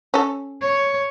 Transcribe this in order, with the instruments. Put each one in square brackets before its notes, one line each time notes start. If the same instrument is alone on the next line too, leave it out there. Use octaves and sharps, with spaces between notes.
[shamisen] C#4 A4
[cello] C#5